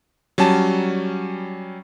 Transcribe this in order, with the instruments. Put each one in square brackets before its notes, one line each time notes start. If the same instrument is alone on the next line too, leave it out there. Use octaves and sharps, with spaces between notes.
[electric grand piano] F#3 G3 C#4 A5